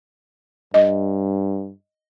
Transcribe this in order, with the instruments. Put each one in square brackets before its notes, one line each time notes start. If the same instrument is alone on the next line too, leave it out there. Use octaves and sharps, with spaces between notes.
[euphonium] G2 [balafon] D#5